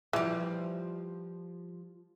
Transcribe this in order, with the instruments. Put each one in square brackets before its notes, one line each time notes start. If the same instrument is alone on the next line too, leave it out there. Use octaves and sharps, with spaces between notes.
[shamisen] E3 [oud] F3 G3